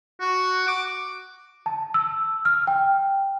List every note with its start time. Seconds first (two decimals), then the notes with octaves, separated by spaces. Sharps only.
0.20 F#4
0.67 D6
1.66 A5
1.94 E6
2.45 F6
2.67 G5